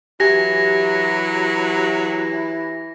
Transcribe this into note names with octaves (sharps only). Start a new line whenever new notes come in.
E3 F#3 E4 G4 G#5 G#6 A#6